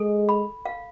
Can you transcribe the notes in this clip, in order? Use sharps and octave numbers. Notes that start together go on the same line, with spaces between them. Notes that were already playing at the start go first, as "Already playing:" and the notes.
Already playing: G#3 A4
B5
F5